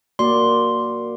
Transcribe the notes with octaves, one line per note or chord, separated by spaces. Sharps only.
A#3 F#4 D5 C6